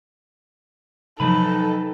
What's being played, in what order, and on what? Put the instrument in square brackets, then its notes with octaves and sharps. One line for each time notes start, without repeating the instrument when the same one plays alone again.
[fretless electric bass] C3 F3 F#3 [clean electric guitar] D#3 B4 B5 [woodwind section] D#4 [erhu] A4